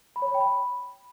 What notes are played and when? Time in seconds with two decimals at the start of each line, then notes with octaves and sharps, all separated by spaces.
0.16 B5
0.22 C#5
0.28 B5
0.34 G5
0.41 B5